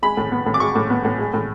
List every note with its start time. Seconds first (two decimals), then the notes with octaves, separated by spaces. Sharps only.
0.02 G#3 B5
0.17 A2
0.32 B3
0.46 A2
0.54 D6
0.60 G#3 C#6
0.75 A2
0.90 B3
1.05 A2
1.19 G#3
1.34 A2